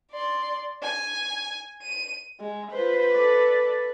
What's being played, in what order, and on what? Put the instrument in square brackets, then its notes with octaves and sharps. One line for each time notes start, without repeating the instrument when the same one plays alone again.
[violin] D5 C6
G#5
D#7
[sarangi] G#3
[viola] F4 C5 [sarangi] B4
[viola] A4 D5